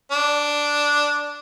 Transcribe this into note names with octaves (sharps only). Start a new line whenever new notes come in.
D4